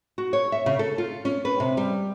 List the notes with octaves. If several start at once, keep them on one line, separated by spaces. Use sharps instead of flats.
F#4
C#5
E5
C#3
A4
F4
C#4
B4
C3
G3